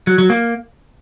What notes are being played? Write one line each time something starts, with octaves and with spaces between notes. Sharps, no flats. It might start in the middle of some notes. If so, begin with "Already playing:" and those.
F#3
F#3
A#3